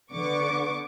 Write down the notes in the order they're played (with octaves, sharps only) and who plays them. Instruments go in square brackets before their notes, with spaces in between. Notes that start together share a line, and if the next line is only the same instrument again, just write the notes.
[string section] D3 B3 C#6 D6